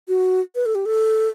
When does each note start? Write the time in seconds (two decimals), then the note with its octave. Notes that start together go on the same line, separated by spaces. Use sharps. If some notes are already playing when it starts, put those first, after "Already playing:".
0.08 F#4
0.55 B4
0.66 A4
0.75 G4
0.86 A4